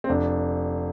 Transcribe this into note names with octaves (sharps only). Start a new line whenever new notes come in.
C4
F1 D4